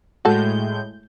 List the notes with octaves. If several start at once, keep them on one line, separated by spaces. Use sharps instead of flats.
A2 G#3 F#4 A4 G6